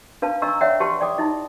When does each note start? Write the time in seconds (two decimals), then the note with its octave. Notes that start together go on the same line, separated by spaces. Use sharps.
0.22 D4 B4 F5 A5
0.42 D4 D#5 A#5 C#6 E6
0.61 C#5 D5 E5 F#5 G5
0.80 G4 B4 F#5 A5 C6 C#6
1.01 D5 G5 D6 D#6
1.18 D#4 E4 D#5